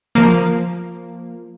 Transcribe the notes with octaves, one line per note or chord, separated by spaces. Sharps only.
F3 A#3